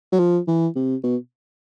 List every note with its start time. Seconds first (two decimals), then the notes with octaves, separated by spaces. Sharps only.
0.12 F#3
0.19 F3
0.48 E3
0.76 C3
1.03 B2